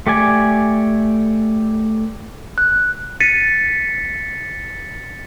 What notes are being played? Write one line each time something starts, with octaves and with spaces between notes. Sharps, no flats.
A3 G4 D5 G#5
F#6
A6 B6 C#7 D#7